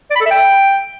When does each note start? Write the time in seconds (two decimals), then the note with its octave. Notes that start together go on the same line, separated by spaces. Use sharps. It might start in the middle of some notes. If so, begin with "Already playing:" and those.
0.11 D5
0.16 B5
0.21 A4
0.26 E5
0.31 G5